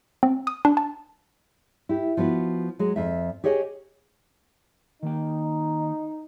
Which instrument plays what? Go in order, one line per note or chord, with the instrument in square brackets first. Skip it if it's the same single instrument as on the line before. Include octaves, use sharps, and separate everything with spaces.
[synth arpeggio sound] C4
D#6
D4
A5
[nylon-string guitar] E4 G4
F3 B3 F#4 B4
F#3 G#3
F2 E5
G4 G#4 C#5 D#5 F5 G#5
[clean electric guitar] D#3 A#3 G5 [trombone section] D#4